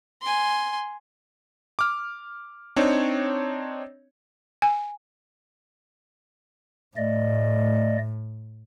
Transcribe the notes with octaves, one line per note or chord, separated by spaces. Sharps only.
G#5 C6
D6 F6
C4 D4 D#4 C#5
G#5
A2 A3 D5 D#5